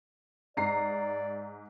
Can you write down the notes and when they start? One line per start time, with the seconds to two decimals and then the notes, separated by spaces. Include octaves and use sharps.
0.57 G#2 D5 A#5 C7